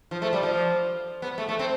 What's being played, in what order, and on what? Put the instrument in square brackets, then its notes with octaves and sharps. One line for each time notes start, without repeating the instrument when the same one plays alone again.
[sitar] F3
A3
G3
F3
B3
A3
A3
C4